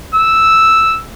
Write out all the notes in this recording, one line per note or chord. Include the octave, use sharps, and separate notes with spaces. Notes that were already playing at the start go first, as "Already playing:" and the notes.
E6